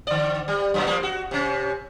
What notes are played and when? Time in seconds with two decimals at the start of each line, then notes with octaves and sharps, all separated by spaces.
0.07 D3 D5
0.48 G3
0.74 F#2 B2 F#3
0.87 F3 G3 A#3
1.03 F#4
1.31 C3 C#4